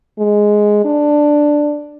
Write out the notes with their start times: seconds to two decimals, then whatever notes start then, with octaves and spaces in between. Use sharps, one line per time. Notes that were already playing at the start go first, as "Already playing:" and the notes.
0.19 G#3
0.85 D4